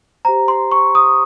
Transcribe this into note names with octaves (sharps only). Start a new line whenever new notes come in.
G4 C5 A#5
C6
C#6
D#6